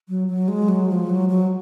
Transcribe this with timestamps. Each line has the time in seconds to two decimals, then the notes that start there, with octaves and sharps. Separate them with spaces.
0.08 F#3
0.28 F#3
0.48 G#3
0.68 F#3
0.89 F3
1.10 F#3
1.29 F#3